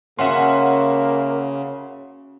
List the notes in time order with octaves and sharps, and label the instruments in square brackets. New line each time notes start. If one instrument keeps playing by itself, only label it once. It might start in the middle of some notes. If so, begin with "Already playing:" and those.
[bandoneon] C#3 [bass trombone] A#3 [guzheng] C#4 F#4 [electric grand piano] E5 F#5 C6